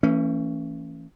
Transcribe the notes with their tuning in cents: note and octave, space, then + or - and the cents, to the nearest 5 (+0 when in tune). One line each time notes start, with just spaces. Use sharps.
E3 +0 A3 +45 C#4 +0